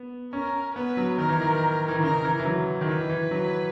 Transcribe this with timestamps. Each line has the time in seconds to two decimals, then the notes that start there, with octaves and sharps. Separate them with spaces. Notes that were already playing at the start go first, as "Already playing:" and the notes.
Already playing: B3
0.33 C#4 A#4
0.75 B3 B4
0.97 F#3
1.18 D#3 A#4
1.29 E3
1.41 D#3
1.88 E3
1.95 D#3
2.03 C#3 A#4
2.25 E3
2.40 E3
2.45 F#3
2.81 D#3
2.88 E3 B4
3.09 E3
3.31 F#3